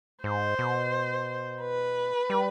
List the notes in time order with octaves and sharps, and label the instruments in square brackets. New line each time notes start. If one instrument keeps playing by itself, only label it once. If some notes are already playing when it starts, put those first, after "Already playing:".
[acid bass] G#2 [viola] C5
[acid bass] B2
[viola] B4
[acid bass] G3